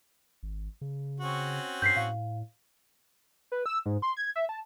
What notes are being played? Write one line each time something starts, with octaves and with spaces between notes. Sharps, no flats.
G#1
C#3
C4 C#4 F#4
G2 G6 B6 C7
A2 F5
B4
E6
G#2
C6
G#6
E5
A5